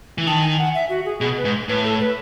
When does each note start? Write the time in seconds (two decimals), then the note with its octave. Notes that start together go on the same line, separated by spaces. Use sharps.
0.18 E3
0.27 D#3 A5
0.42 G#5
0.58 F#5
0.75 E5
0.89 F#4
1.05 G#4
1.21 B2 G#4
1.37 B4
1.45 G#2
1.69 A2 B4
1.84 A4
2.00 B4